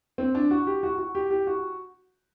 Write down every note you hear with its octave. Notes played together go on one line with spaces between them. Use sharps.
C4
D4
F#4
G4
F#4
F#4
G4
G4
F#4